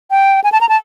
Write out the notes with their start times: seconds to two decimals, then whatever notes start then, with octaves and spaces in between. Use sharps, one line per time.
0.11 G5
0.44 G#5
0.52 A5
0.61 A#5
0.69 A5